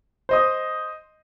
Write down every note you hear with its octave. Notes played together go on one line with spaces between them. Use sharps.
C5 D#5 D#6